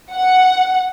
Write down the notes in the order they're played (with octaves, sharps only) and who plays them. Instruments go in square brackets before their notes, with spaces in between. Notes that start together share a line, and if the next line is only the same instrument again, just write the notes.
[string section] F#5